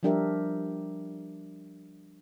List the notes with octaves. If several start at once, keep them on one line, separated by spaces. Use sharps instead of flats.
F3 G3 D4 G4 A#4 E5